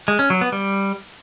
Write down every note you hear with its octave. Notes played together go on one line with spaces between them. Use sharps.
G#3
C#4
F#3
B3
G3